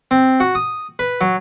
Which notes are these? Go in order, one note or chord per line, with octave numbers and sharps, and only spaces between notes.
C4
F#4
D#6
B4
F#3